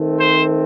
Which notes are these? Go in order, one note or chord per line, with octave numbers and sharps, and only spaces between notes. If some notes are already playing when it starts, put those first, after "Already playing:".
Already playing: D#3 A3 C4
C5